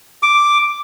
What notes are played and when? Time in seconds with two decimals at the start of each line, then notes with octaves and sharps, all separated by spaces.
0.23 D6